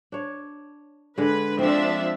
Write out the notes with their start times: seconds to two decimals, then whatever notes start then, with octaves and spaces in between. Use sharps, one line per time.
0.12 D4 C#5
1.18 D3 G#3 B4
1.59 F3 C4 D4 E5